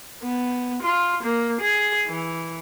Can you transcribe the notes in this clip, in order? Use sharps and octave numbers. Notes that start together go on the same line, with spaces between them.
B3
F4
A#3
G#4
E3